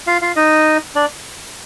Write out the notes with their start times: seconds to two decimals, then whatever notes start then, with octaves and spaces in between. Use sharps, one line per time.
0.07 F4 F5
0.22 F4 F5
0.36 D#4 D#5
0.95 D4 D5